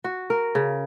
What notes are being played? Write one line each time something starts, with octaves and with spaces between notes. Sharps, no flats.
F#4
A#4
C#3